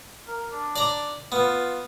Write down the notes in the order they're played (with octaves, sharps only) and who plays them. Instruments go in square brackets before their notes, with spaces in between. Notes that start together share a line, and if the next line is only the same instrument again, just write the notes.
[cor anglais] A#4
D4
[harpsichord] D5 A#5
[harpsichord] B3 [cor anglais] F4